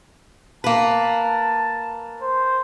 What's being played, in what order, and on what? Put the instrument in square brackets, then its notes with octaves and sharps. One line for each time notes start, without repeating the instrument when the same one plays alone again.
[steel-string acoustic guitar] A#3 B4 [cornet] A5
[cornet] C5